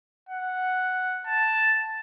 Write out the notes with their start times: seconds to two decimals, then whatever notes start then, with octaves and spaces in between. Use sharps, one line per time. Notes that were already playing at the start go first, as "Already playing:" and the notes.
0.30 F#5
1.27 A5